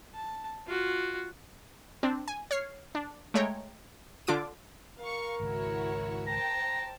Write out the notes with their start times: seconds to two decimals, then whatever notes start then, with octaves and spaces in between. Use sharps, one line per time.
0.14 A5
0.67 F4 F#4
2.03 C4 D4
2.28 G#5
2.51 C#5 F6 C7
2.95 D4
3.34 G#3 A3 C#5 G5 A#5
4.27 D3 D4 F4 D6 D7
5.00 A#4 F5 C#6
5.40 G#1 C#2 E4 F#4 C#5
6.27 C5 G5 A5 A#5